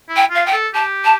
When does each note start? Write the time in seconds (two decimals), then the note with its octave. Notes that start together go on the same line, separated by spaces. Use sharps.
0.09 E4
0.16 G5
0.30 F4 F5
0.46 G5
0.53 A4
0.74 G4 A5
1.04 A5